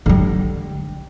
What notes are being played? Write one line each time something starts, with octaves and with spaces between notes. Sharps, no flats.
D3 G3